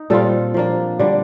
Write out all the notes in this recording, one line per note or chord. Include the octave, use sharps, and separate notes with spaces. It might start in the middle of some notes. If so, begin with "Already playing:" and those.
Already playing: D#4
A#2 G3 C4 F4 A4
F3 A#3 D4
D3 G3 D4